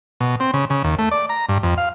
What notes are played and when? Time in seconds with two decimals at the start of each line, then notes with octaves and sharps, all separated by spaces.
0.20 B2
0.40 C4
0.54 C#3
0.70 C#3
0.84 D#2
0.99 A3
1.11 D5
1.29 A#5
1.49 G2
1.63 F2
1.78 F5